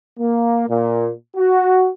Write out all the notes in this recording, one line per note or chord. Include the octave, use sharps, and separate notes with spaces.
A#3
A#2
F#4